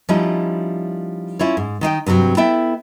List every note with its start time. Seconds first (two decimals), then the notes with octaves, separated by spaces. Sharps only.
0.09 F3 G3 C#4 D#4 E4
1.39 C#4 E4 F4 C#5
1.57 G#2
1.81 D#3 D#4 F5 G5
2.06 G2 C3 D#3 F#3 C4
2.37 B3 E4 A4 E5 G5